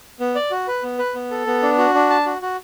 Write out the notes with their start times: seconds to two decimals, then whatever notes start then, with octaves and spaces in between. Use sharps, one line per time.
0.20 B3
0.35 D5
0.51 F#4
0.67 B4
0.83 B3
0.99 B4
1.15 B3
1.31 A4
1.46 B3
1.62 D4
1.78 F#4
1.94 D4
2.10 A5
2.26 F#4
2.42 F#4